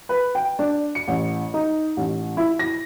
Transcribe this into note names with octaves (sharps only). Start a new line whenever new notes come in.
B4
G5
D4
C#7
A1
D#4
A1
E4
A#6